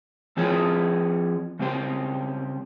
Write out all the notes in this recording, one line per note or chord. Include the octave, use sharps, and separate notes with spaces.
F3 C4 F4 G#4 C#5
C#3 G3 C4 G4 C5